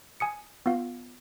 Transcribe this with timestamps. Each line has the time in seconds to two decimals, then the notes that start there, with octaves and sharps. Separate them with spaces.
0.20 G#5 D#6 C#7
0.66 B3 F4 F5